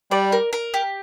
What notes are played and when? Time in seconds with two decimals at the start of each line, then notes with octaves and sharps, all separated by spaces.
0.11 G3 D5
0.32 A#4
0.53 A#4
0.74 G4